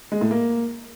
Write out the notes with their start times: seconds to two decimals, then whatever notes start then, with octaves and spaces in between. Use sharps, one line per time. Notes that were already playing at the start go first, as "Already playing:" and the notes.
0.12 G#3
0.21 A2
0.31 A#3